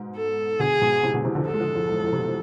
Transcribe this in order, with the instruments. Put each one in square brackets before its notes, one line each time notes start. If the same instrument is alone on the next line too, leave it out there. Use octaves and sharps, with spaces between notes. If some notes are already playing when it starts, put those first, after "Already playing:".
Already playing: [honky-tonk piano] G#2 B2
[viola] A4
[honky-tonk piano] B2 D3 [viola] G#4
[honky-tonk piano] G#2 B2
A2 C3
B2 D3
C3 E3
D3 F3
[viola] A4
[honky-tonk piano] G#3
D3 F3
F2 A2
E2 G#2
F2 A2
C3
B2